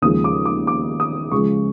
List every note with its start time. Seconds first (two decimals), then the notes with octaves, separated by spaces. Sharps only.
0.02 D#2 C#3 F3 G#3 D#6
0.24 D6
0.45 D6
0.67 D6
1.00 D#6
1.31 C#2 C#3 F3 G#3 C#6